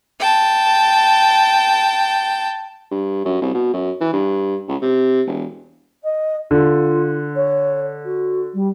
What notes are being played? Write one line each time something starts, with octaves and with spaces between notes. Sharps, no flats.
G5 A5
G2
F#2
C2
B2
F#2
E3
G2
C#2
C3
E1
D#5
D3 F4
C#5
F#4
G3